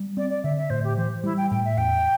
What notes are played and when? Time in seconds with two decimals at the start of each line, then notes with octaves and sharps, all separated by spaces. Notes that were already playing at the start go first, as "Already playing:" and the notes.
Already playing: G3
0.17 C4 D5
0.30 D5
0.43 D3 E5
0.57 E5
0.70 A2 C5
0.84 G4
0.98 E3 C5
1.24 G3 E4
1.37 G5
1.50 A2 G5
1.65 E5
1.77 E2 G5